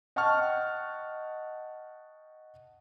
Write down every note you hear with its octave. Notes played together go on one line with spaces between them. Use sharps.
D#5 F#5 G5 A5 C#6 F6